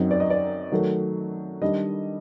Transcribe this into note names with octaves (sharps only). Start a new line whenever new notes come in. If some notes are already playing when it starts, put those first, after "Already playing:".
Already playing: F#2 F#3 C4 D#4
D5
D#5
D5
D#3 F#3 A3
D#3 G3 D4 D#5